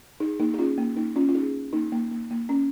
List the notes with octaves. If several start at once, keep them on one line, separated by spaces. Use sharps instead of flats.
D#4 G#4
A#3 D#4
G#4
C#4 F4
A#3
A#3 D#4
C#4 F4
F4
D#4 G#4
A#3 D#4
A#3
A#3
A#3
C#4